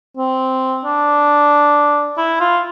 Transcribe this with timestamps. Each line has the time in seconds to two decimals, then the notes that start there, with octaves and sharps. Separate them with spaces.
0.18 C4
0.85 D4
2.18 E4
2.40 F4